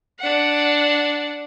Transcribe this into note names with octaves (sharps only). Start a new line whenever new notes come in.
D4 F#5